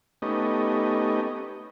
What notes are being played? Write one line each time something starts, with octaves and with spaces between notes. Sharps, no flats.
A3 B3 C#4 D#4 G4 D#5